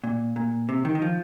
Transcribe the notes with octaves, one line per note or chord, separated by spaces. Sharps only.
A#2
A#2
C3
D#3
D#3
F3